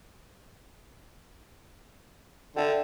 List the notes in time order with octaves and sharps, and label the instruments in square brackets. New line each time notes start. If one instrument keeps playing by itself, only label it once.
[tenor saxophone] D3 [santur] E5 G5